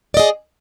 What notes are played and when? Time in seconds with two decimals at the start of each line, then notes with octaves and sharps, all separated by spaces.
0.14 D5
0.17 D#5
0.19 G#4